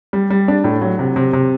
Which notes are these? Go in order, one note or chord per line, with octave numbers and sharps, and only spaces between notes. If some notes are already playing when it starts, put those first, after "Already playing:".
G3
G3
D4
A2
F#3
C3
C3
C3